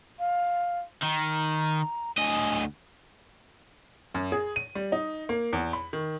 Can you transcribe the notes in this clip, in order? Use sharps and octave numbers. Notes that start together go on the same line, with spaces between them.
F5
D#3 A#5
D2 D#5 G#5
F#2
G#4
D#7
G3
D#4
A#3
E2
B5
D#3